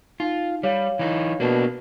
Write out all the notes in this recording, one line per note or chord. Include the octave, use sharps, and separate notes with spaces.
D#4 F4
G3 C#5 F5
E3 D#4
B2 A#3 D4